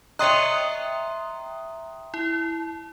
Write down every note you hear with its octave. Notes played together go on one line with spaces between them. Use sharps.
C#5 D#5 E5 G5 A#5 C6 D#6 F#6
E4